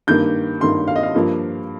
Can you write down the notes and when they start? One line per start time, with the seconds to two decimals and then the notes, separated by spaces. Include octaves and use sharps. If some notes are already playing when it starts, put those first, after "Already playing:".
0.07 G2 D#3 A#3 G6
0.60 G2 D#3 A#3 C6
0.88 F5
0.96 D#5
1.03 F5
1.15 G2 F3 A#3